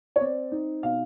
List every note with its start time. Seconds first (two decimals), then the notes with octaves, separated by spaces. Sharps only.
0.16 C#5
0.20 C4 D5
0.52 D#4
0.83 B2 F5